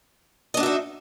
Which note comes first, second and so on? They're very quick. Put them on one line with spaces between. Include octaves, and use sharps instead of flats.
D#5 D4 F#4 E5 D#4